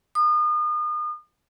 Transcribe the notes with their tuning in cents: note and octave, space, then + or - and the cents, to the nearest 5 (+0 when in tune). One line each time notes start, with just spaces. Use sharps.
D#6 -35